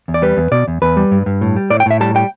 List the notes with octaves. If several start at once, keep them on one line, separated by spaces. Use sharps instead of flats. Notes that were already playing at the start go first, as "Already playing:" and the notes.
E2
D5
G3 B4
E2
B2 D5
E2
E2 B4
G3
G2
G2
A2
G3
A2 D5
G5
A2 E5
G3 A5
G3 G5